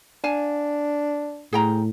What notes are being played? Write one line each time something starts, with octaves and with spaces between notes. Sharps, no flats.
D4 F5 G#5 A5
A2 G#4 G5 A#5